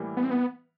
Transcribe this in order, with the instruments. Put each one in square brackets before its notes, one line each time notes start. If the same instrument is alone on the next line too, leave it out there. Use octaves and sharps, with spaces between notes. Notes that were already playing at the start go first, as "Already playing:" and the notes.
Already playing: [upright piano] A2 E3 G3 A#3
[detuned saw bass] B3
C4
B3